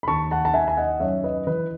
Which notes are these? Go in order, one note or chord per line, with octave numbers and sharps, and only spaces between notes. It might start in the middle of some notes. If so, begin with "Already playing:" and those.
B5
D#2 A5 C#6
F#5 A5
A5
D#3 E5 G#5
G#5
D#5 F#5
F#2 C#5 E5
B4 D#5
E3 B4